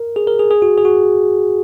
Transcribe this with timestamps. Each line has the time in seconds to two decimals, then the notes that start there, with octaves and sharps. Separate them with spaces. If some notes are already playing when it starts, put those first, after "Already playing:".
Already playing: A#4
0.16 G#4
0.27 A#4
0.39 G#4
0.51 G#4
0.62 F#4
0.78 G#4
0.85 F#4